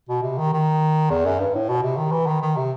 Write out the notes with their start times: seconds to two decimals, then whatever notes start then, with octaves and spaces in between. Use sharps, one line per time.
0.09 B2
0.23 C3
0.38 D#3
0.53 D#3
1.10 E2
1.26 F#2
1.40 G2
1.55 A2
1.69 B2
1.83 C3
1.97 D#3
2.12 E3
2.27 D#3
2.42 D#3
2.57 C3